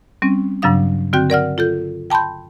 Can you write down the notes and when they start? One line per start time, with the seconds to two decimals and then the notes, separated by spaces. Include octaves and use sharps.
0.22 G3 C4 C#4
0.62 G2 C#3 F#3 D4 F5 D#6
1.13 D3 C4 F#4 G5 G6
1.30 A#4 D5 F#5 F6
1.58 F4 A4 G6
2.10 G5 A5 B5 C6 G6